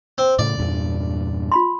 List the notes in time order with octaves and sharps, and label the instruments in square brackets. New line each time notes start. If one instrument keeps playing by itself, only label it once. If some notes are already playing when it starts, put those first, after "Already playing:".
[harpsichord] C4
[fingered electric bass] A2 C#3 A3 [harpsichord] D5
[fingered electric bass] E2 G2 A#2
[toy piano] F4 B5 C6